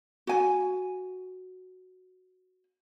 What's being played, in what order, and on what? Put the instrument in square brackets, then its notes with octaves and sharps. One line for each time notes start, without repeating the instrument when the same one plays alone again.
[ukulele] F#4 G#5